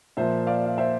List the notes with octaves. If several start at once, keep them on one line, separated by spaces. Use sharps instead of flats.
A#2 F3 C5 E5
D5 F5
F5
C5 E5